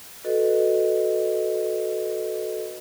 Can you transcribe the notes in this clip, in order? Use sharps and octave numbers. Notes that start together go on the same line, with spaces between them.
F#4 A4 B4 D#5